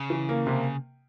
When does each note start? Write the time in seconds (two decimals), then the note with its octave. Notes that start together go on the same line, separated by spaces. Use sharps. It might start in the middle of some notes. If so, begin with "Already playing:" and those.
Already playing: C#3
0.10 E3
0.29 A#3
0.47 C3